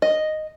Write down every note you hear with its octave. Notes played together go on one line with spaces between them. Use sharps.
D#5